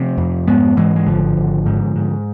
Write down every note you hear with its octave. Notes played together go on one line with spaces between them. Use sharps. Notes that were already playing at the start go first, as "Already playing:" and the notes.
Already playing: C3 F3 A3
F2
G#2 G#3 B3
G#2 E3 G#3
G#3
G#1 D3 F3
G#1
G#2
G#2